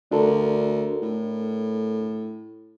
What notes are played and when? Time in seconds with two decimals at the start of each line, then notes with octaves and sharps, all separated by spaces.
0.12 D2 D4 A4 A#4
1.02 A2